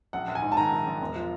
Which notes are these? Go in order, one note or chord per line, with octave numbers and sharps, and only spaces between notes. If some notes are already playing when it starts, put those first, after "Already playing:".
A#1 F#5
A#1
G#5
G#2
A5
D#3 A#5
A#1
A#1
E1
F3